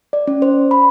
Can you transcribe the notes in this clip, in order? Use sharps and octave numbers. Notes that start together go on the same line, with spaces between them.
D5
C#4
C5
B5